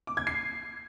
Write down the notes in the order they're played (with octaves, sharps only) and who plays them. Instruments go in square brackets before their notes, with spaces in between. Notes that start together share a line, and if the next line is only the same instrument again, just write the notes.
[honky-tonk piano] D6
G#6
C7